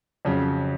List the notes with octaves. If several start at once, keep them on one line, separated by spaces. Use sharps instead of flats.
F2 C#3 F#3